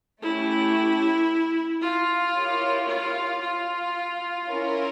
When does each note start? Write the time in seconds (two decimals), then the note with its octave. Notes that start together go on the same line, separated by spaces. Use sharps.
0.22 A3 C#4 E4 G4
1.82 F4
2.35 E4 G4 A#4 C#5
2.88 F4
3.41 F4
4.48 C#4 E4 A#4